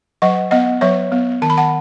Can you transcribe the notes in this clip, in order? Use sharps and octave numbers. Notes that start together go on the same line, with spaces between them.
F#3 D#5 F#5
B3 D#5 F#5
F#3 C#5 E5
B3
D#3 A5
B5
F#5 A5